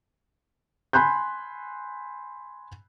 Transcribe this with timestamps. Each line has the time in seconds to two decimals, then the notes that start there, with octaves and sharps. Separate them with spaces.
0.93 G#5 B5 C6 F#6 G6